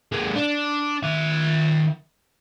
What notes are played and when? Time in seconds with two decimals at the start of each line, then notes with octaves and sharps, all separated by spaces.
0.12 G#3 A#3
0.35 D4
1.03 D#3 E5